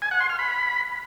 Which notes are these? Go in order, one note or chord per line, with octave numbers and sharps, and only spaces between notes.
G#5
F#5
C6
F6
B5